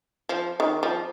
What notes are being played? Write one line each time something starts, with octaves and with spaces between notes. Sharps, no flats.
F3
D#3
F3